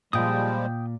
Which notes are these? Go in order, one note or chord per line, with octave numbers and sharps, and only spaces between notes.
A#2 F3 G3 G#3 G5 D#6